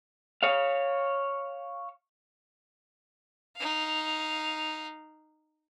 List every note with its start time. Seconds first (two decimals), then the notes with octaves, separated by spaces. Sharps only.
0.43 C#5 F5
3.56 D#4 F5